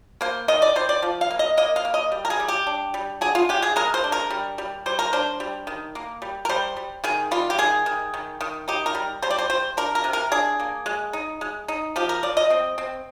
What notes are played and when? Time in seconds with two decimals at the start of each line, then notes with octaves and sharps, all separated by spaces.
0.21 A#3 C5
0.48 D#3 D#5
0.62 D5
0.76 D#3 C5
0.89 D5
1.02 F3
1.21 F5
1.31 A#3
1.39 D#5
1.57 A#3 D#5
1.76 F5
1.85 A#3
1.94 D#5
2.12 G3
2.25 A#4
2.30 G#4
2.40 G3
2.48 G4
2.67 D4
2.94 G3
3.21 D3 G#4
3.35 F4
3.49 G#3 G4
3.62 G#4
3.76 G#3 A#4
3.94 C5
4.04 D4
4.12 A#4
4.30 G3
4.58 G3
4.86 G3 C5
4.99 A#4
5.13 D4 C5
5.40 G3
5.67 D#3
5.95 A#3
6.22 G3
6.45 A#4
6.49 G3 C5
6.77 G3
7.04 D#3 G#4
7.31 G3 F4
7.50 G4
7.58 D#3 G#4
7.86 D#3
8.14 D#3
8.41 D#3
8.68 D#4 G4
8.86 A#4
8.95 G3
9.22 G3 C5
9.31 D5
9.38 C5
9.50 G3 C5
9.77 D4 A#4
9.95 A#4
10.04 C3
10.13 A#4
10.32 D4 G#4
10.60 A#3
10.86 G#3
11.13 D#4
11.41 G#3
11.68 D#4
11.96 F3 G4
12.09 A#4
12.23 F3 D5
12.37 D#5
12.50 C4
12.78 C4